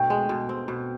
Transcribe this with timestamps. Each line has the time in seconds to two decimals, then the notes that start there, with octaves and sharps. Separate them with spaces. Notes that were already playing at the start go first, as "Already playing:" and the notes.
Already playing: B2 A3 D4 G5
0.10 G#3
0.29 B2
0.49 C4
0.68 B2